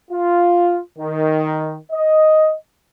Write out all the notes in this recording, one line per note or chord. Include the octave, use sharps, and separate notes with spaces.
F4
D#3
D#5